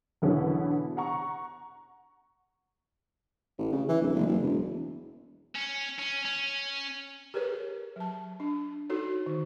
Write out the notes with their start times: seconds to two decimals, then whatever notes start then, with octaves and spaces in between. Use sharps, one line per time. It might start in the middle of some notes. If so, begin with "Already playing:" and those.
0.22 E2 B2 D3 E3 B3 C#4
0.97 F#5 A#5 C#6
3.58 A1
3.72 C#3
3.89 E3
4.01 D1
4.14 F#1
4.27 F#1
4.42 E1
5.56 C#4
5.99 C#4
6.25 C#4
7.34 G4 G#4 A#4 B4 C#5
7.96 F#3 A5
8.40 D4
8.90 D#4 F#4 A4 C#5
9.26 D#3